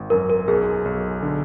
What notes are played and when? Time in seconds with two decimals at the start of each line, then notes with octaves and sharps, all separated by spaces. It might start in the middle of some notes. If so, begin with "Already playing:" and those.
Already playing: G#1
0.10 F#2 A#4
0.30 A#4
0.48 B1 G#4
0.85 B1
1.23 D3